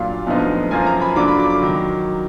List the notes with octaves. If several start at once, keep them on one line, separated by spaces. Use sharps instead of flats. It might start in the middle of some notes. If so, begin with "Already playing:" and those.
Already playing: A#2 F#3 D4 F4 F5
D2 D3 F3 B3 D#4
F#2 F3 A#3 F4 G#5
A#5
B5
D3 F#3 D4 F4 D6
B5
D6
D6
D#3 F#3